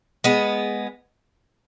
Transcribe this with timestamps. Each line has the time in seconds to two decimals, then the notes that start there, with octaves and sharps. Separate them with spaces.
0.24 G#3 B3